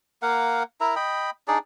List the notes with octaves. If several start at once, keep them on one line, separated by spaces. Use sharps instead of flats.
A#3 A#4 F5 F#5
E4 A#4 E5 A#5
D#5 G5 B5
D4 D#4 G#4 D5